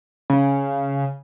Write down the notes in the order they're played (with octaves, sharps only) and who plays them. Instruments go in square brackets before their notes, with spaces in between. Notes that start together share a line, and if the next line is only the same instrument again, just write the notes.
[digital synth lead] C#3